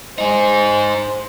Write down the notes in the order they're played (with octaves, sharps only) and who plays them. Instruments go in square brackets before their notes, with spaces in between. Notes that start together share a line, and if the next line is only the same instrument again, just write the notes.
[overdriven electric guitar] D#4 G#4 [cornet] C5